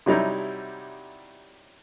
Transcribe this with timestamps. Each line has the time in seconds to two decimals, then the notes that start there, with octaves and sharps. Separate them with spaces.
0.06 C3 F#3 G3 D#4 E4